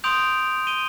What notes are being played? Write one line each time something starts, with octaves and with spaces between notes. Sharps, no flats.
C6 D#6 G6 D7 F7
D#7 G7